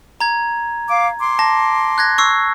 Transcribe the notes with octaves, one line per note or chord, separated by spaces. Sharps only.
A#5 G#6
F5 D6
C6 D6
A5 A#6
F#6 G#6 A#6
C#6 E6 C7